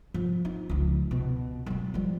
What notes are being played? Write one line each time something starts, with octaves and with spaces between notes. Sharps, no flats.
F3
D#4
C#2 F3
B2
F#3 G#3
F3 G3